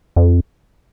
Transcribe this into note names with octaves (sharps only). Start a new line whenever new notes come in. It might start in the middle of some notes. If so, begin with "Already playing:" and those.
F2